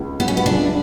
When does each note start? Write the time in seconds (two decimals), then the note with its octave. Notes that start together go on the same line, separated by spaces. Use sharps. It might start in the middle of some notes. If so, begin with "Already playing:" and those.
Already playing: C#2 C#3
0.19 F#3 B3
0.28 C#4
0.37 B3
0.46 C#2 D4